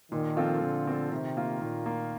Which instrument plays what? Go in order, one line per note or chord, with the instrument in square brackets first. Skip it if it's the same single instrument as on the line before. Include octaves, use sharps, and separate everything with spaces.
[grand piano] A#2 [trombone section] D#3
[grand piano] F3 C4 F4 A4
[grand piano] A#2 [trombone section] D3
[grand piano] F3 C4 F4 A4
[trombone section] C3 [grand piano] D#3
[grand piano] A#3 F4
[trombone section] A#2 [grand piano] D#3
[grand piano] A#3 F4